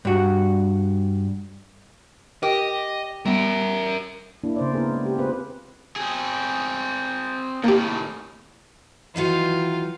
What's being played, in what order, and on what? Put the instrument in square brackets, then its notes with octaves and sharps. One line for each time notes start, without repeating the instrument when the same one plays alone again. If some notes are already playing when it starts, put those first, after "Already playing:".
[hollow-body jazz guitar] G2 F#4
[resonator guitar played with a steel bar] G4 [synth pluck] A#4 [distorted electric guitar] D#5
[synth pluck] G3 B3 [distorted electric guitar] A#4 E5
[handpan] A#3 D4 E4
C#3 C5 D5
A#3 B3 C#4 E4 G#4 A#4
G#3
G4
B3 C4 F4 G#4 B4 C5
[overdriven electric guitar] C4 G#4
[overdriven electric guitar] A2 D#3 [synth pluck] A#3 G4
[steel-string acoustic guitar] D#3 F#3 D#4 [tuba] E3 [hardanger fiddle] F4